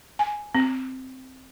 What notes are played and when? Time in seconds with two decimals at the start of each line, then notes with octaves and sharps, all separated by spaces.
0.19 G#5
0.55 C4